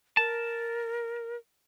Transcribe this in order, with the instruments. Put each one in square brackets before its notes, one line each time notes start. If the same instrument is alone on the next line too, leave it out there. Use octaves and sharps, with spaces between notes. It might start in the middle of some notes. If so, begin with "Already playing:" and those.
[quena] A#4 [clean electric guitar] A5